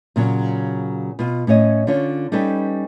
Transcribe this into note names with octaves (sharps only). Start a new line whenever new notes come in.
A#2 C#3 F#3
B2 F4
A2 C#4 C#5 D#5
D3 C#4 F4 C#5
G3 C#4 D#4 A4 B4